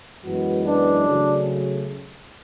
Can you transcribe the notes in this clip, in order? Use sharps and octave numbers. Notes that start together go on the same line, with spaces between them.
F#2 E3 G#3 B3 F#4
D4
C#3 F#3 A3